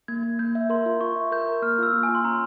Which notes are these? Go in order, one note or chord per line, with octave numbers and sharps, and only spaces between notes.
A#3 G#6
A#3
A#3 G6
E5
A#4 C6
F4
F4 C#6
E5
A#4 G6
A#4
A#3 F6
F4 E6
A#3
G#5
F4
C6
C#4 A#5